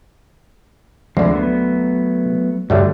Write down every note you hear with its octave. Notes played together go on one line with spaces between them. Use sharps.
D2 D3 F3 G#3 C4
F#3 A3 B3
G2 D3 F#3 G3 A3